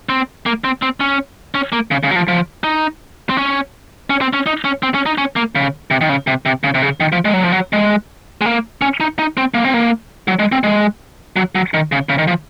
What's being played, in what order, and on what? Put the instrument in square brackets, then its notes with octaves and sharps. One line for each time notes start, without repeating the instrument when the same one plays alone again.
[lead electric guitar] C4
A#3
C4
C4
C#4
C#4
A#3
C#3
C#3
F#3
F3
F3
D#4
C4
C#4
C#4
C4
C#4
D#4
C#4
C4
C#4
D#4
C#4
A#3
C#3
C3
D#3
C#3
C3
C3
C#3
C3
C#3
D#3
F3
G#3
F#3
F3
F#3
G#3
G#3
A#3
C#4
D#4
D#4
C4
A#3
C4
A#3
F#3
G#3
C4
G#3
F#3
F#3
D#3
C#3
C#3
D#3
F3